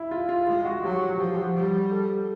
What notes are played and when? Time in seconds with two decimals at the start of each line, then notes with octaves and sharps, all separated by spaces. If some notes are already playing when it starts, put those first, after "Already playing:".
Already playing: E4
0.11 F4
0.29 F4
0.47 G#3 F4
0.65 F#4
0.83 F#3 G4
1.19 F3 G4
1.27 F#4
1.35 G4
1.55 G3
1.91 A4